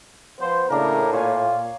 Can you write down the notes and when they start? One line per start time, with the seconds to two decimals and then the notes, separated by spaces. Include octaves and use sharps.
0.40 F3 B3 C5
0.70 A2 C#3 A#3 D4 A#4 A#5
1.13 A#2 F4 C#5 F5 G#5